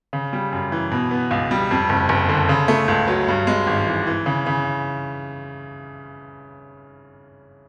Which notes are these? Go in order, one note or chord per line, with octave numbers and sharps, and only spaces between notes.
C#3
G3
F#2
E3
B2
B3
C#2
G3
F2
F#1
F#1
D3
C#3
A3
C#2
F#3
G2
G#3
G#1
E3
E3
C#3
C#3